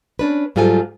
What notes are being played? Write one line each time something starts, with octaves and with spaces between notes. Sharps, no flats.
C#4 D4 B4
G#2 F#3 G3 F4 A4 G#5